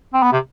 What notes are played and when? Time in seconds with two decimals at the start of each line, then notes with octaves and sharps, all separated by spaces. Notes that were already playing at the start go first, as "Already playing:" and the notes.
0.14 C4
0.23 B3
0.32 C3